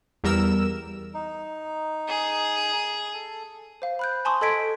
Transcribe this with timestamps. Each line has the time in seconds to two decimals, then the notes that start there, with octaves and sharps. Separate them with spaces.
0.24 E2 G3 A#4 E6 E7
1.14 D#4
2.09 G#4
3.14 A4
3.82 C5 F5
3.99 B5 F#6 G6
4.25 G#5 A5 C6 C#6 D#6
4.41 A4 D#5 G#6 B6 D7